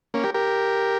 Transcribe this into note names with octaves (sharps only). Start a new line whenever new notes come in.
A#3 C#4
G4 A#4
G4 A#4